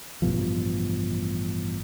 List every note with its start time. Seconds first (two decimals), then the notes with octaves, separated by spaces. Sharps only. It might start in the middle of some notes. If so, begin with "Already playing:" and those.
0.22 A1 G2 B2 F3